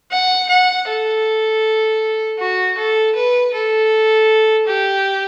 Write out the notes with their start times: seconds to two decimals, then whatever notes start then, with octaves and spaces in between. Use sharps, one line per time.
0.11 F#5
0.49 F#5
0.87 A4
2.39 F#4
2.78 A4
3.15 B4
3.54 A4
4.67 G4